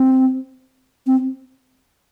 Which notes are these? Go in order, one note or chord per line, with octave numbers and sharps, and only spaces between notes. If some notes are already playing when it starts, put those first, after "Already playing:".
Already playing: C4
C4